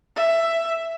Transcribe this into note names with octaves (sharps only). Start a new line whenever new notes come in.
E5